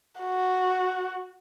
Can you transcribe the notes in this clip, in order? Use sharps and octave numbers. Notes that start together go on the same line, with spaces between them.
F#4